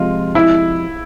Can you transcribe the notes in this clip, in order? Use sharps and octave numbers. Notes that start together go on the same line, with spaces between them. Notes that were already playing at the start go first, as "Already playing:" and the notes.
Already playing: C3 F3 G#3 F4
E4